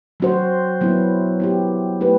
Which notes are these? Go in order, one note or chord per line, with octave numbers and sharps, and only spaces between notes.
F#3 C4 F#4 C5
F#3 B3 E4
B3 E4 G4
A3 E4 G4 B4